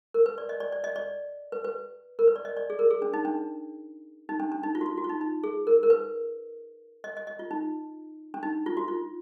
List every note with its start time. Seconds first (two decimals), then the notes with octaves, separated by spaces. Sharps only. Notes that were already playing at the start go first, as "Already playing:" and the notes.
0.14 A#4
0.26 B4
0.38 D5
0.49 D#5
0.60 D5
0.72 D5
0.84 D#5
0.96 D5
1.52 B4
1.64 B4
2.19 A#4
2.28 B4
2.36 D5
2.45 D#5
2.57 D5
2.70 G#4
2.79 A#4
2.91 G#4
3.02 D4
3.14 D#4
3.25 D4
4.29 D#4
4.40 D4
4.52 D4
4.63 D#4
4.75 F4
4.81 F#4
4.86 F4
4.97 F#4
5.04 F4
5.10 D#4
5.21 D#4
5.44 G#4
5.67 A#4
5.83 A#4
5.90 B4
7.04 D#5
7.17 D#5
7.27 D#5
7.39 F4
7.51 D#4
8.34 D4
8.43 D#4
8.66 F4
8.77 F#4
8.88 F4